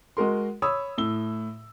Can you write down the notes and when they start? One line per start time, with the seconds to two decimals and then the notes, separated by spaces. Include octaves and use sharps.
0.17 G#3 F#4 A#4 C6
0.62 C#5 B5 D#6 E6
0.98 A2 E6 G7